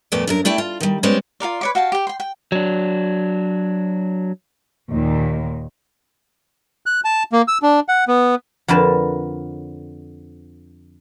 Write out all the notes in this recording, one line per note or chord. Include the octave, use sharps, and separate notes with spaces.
F2 A#2 A3 B3 D5
F#2 D4 A#4
A3 E4 D5 G5 A5
F4
D#3 G3
G3 G#3 B3 C#4 C5 D5
F4 A4 A#4 D5
B4 C#5 D6
F#4 F5 G5 A5
G4 G5
G5 C6
G5
F#3 D4
D#2 A#2 D#3
F#6
A5
A#3
E6
D4
F#5
B3
F2 D3 A#4 B4 A5